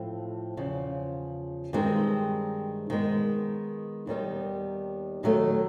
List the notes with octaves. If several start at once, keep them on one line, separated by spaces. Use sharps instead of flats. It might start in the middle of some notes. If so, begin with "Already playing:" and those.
Already playing: A2 F3 A3 C4
E2 C#3 F3
G2 D#3 G#3 C4
D#3 G#3 B3
D#2 D#3 G3 B3
D#2 D#3 F#3 A3